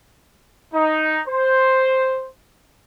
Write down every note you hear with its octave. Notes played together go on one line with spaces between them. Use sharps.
D#4
C5